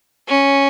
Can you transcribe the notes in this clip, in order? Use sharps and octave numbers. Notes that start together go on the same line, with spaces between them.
C#4